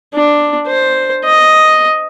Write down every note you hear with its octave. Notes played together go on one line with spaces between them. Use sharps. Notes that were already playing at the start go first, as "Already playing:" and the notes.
D4
C5
D#5